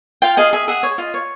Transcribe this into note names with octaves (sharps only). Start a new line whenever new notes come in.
F4 F5 G5
G#4 D#5 F5
G#4 E5
G#4 E5 F#5
C#5
F4 D#5
C#5